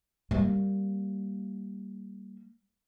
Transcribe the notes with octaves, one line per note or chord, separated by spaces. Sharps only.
G3 A#3